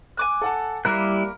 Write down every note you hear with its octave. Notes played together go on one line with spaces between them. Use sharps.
G#5 D6 F#6
A4 F#5 A5
G3 A#3 E4 A#4 B5 F#6